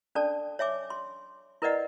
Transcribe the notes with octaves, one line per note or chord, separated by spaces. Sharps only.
C#4 D4 A4 D5 A5
C#5 E5 G#5 D6
C6
E4 A#4 B4 D5 D#5 F#5